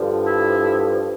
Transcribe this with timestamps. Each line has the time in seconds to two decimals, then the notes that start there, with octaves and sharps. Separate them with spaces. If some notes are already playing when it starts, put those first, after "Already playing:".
Already playing: G2 D3 F3
0.26 E4